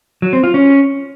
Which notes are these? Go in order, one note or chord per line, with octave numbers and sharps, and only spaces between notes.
F#3
C4
F4
C#4